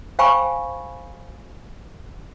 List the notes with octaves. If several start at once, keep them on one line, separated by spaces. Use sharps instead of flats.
C5 F5 G5 G#5 B5 C#6